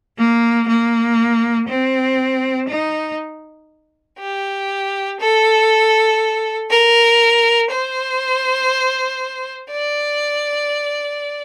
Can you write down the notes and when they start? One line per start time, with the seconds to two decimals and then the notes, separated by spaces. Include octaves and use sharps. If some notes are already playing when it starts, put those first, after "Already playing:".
0.17 A#3
0.68 A#3
1.68 C4
2.68 D#4
4.19 G4
5.19 A4
6.69 A#4
7.70 C5
9.71 D5